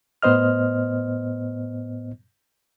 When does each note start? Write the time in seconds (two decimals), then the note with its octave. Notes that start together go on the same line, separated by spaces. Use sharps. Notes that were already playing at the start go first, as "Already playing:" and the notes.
0.23 A2 B3 C5 D#5 F6